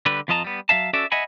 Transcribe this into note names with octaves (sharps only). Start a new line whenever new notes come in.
D3 G3 B4
F2 F3 F4 D#5 A5 A#5
G3 B3
F#3 B3 E5 F5 A5
C#4 F#4 A4 D5 E5
D#5 E5 F#5 G#5 B5